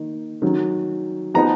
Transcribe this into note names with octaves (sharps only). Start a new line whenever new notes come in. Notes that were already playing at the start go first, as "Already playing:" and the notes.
Already playing: D#3 A#3 D#4
D#3 F#3 C#4
F3 B3 D#4 A#5